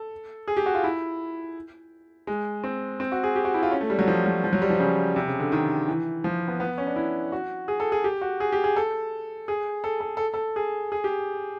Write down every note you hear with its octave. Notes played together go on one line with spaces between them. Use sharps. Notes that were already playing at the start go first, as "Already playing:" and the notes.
Already playing: A4
G#4
G4
F#4
F4
E4
G#3
C4
C4
F#4
G#4
G4
F#4
E4
F4
C#4
A3
G3
F#3
F3
F#3
F3
F#3
G3
F3
C#3
C3
C#3
D3
D#3
E3
F3
B3
B3
C#4
D4
E4
F#4
G#4
A4
G#4
G4
F#4
G#4
G4
G#4
A4
G#4
A4
A4
A4
A4
G#4
G#4
G4